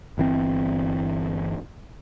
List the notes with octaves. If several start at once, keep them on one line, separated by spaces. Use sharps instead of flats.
G1 E3 C4